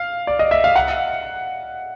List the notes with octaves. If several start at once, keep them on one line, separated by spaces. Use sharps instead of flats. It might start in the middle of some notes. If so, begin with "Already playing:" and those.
Already playing: F5
D5
D#5
E5
F5
F#5